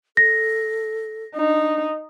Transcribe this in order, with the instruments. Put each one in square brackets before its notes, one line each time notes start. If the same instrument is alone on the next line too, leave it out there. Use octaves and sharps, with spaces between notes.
[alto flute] A4 [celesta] A#6
[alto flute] D4 [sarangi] D#4